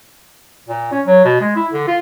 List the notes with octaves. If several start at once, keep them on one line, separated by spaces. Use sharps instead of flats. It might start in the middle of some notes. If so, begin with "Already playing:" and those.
A#2
C#4
F#3
B2
G#3
E4
D3
F4